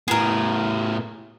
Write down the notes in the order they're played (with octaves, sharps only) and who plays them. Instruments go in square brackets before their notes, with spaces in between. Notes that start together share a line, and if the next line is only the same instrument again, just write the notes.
[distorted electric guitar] A2 B3 [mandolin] G#4 A#4